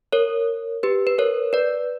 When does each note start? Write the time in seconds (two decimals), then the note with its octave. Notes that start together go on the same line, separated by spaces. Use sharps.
0.12 A#4 C#5
0.83 G4 B4
1.07 B4
1.18 A#4 C#5
1.53 B4 D5